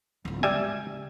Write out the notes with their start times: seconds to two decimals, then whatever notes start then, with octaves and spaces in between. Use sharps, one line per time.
0.25 D1 F4
0.43 C#3 G3 G#3 E5 G#5